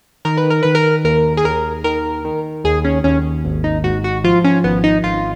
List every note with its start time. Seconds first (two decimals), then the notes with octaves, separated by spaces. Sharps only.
0.25 D#3 A#4
0.37 B4
0.50 A#4
0.63 D#3 B4
0.75 A#4
1.04 D#2 A#4
1.37 G#4
1.45 D#2 A#4
1.84 D#3 A#4
2.25 D#3
2.64 D#2 G#4
2.84 C#4
3.04 D#2 C#4
3.45 G#1
3.64 D#4
3.84 G#2 F#4
4.04 F#4
4.24 F3 F4
4.44 C#4
4.64 G#1 B3
4.84 D#4
5.04 G#1 F4